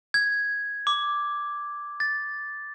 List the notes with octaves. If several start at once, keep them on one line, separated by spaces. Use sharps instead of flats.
G#6
D6
A6